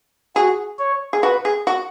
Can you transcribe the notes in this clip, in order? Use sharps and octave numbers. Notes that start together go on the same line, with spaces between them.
F#4 G#4
C#5
G#4
F#4 B4
G#4
F#4